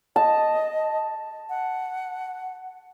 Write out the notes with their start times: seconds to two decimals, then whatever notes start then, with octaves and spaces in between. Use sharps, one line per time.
0.16 D#5 A5
1.49 F#5